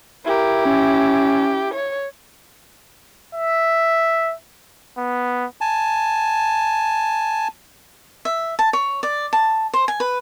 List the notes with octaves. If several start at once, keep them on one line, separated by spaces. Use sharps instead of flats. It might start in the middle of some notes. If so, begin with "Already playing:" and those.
E4 G4 A#4
C#4
C#5
E5
B3
G#5 A5
E5
A5
C#5
D5
A5
C5
G#5
B4